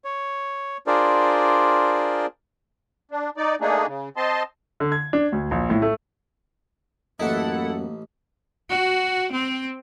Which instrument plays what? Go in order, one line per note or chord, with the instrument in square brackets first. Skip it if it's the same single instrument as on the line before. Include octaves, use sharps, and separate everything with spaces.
[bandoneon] C#5
D4 F4 G#4 A#4 C5 D5
[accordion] D4
D#4 D5
A3 A#3 D4 D#4 G#4
C#3
C4 D#5 A5 C6
[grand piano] D3
G#6
D4
D2
A#1
A2
A3
[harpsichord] A1 D#4 [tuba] F#2 [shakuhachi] A#3 [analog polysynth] E4 A4 F#5
[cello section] F#4
C4